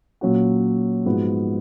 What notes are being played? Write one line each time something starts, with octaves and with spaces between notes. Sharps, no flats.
A#2 F#3 C#4 F#4
G#2 F3 B3 F#4